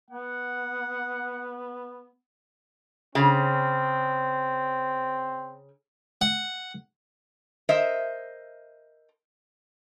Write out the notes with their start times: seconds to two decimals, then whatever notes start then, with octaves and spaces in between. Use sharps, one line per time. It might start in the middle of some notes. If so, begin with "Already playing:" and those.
0.11 B3 F#5
3.15 C#3 C4
6.21 F#5
7.69 A#4 C5 D#5 E5